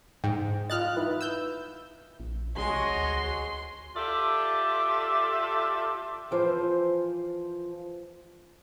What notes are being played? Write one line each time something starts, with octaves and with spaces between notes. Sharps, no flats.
G#2 G5
F4 D#5 F6 F#6 A6
D#4 E4 B4
E6 G6
A#1
C2 G#3 F#4 G#4 C#5 D#5 C6
D2
F4 G4 A4 D5 E5
E3 F3 C5